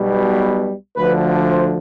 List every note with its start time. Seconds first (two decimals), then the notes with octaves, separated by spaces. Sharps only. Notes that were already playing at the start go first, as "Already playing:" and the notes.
Already playing: B1 B2 G3
0.96 D2 D3 F3 B4
1.50 C5